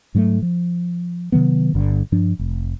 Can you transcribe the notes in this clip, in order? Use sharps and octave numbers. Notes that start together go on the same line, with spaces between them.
G#2 F#3 G#3 A3
F3
C3 D#3 F#3 B3
G1 G2 D3
G2 F3 D4
F1